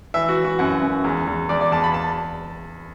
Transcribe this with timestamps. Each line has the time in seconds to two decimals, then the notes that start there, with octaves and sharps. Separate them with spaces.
0.14 E3 E5
0.29 F#4
0.36 E3
0.45 F#4
0.59 F#2 F#5
0.82 F#2
1.04 E2
1.27 E2
1.49 E2 D5
1.61 D5
1.72 E2 A5
1.84 B5
1.94 A5